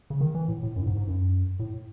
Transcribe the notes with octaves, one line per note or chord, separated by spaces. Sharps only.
C#3
D#3
E3
A2
A2
F#2
A2
G#2
G#2
F#2
A2